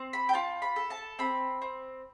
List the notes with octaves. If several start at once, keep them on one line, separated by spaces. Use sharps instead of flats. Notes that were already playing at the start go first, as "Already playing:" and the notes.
Already playing: C4
B5
G5
F4 A5
B5
A4
A5
C4 B5
C4